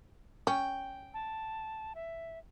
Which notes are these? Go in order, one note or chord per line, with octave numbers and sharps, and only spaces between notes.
C#4 G5
A5
E5